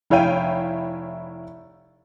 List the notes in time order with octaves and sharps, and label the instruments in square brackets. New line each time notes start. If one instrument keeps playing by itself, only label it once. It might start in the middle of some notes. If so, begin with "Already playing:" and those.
[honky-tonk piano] F1 E4 C#5 F5 G5 D#7